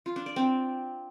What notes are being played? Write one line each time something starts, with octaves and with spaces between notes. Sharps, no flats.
F4
D4
D5
C4